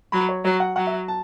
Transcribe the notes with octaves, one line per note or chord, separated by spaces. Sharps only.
F#3 B5
C#5
F#3 C#5
F#5
F#3 F#5
E5
A5